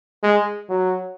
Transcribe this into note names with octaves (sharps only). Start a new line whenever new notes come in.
G#3
F#3